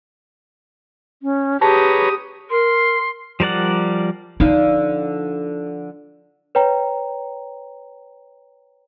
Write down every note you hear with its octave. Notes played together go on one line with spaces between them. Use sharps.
C#4
G4 G#4 B4 C#5 A5 A#5 D#6
A#4 C6
F3 G3 A#4 D5 F#5
D3 F3 D#4 F5
B4 C#5 G5 A#5